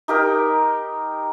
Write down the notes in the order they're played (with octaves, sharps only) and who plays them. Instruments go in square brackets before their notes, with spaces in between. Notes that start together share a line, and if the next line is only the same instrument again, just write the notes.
[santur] D#4 G4 A#4